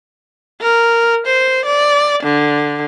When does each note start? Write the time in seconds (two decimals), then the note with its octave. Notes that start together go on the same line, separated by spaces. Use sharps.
0.62 A#4
1.26 C5
1.65 D5
2.23 D3